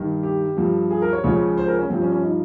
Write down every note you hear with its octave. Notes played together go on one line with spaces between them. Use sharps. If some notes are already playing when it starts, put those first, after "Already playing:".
Already playing: G2 D#3
G4
G2 F3
G#4
A#4
C#5
C#2 C#3 F3 C#5
C5
A#4
C#4
G2 F3 C4
C#4
C#4
D#4